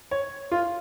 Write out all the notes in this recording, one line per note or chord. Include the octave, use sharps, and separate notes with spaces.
C#5
F4